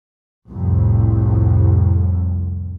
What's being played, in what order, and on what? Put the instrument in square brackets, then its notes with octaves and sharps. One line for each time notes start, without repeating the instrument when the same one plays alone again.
[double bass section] C2 F2 A2